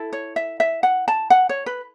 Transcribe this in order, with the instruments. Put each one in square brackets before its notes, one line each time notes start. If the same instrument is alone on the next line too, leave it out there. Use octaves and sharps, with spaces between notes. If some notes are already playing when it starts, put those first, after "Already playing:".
Already playing: [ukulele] E4 A4
C#5
E5
E5
F#5
A5
F#5
C#5
B4